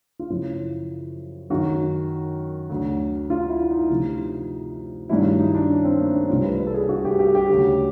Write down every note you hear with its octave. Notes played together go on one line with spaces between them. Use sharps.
F4
F#2 C#3 F3 E4
F#2 D#3 F#3 F#4
D2 D3 F#3
F4
E4
D#4
D2 C3 F3
G2 D#3 F#3 E4
D#4
D4
C#4
C4
A#3
C#4
C2 C3 E3 F4
B4
B4
A4
G#4
F#4
G4
G4
G4
D2 C#3 F#3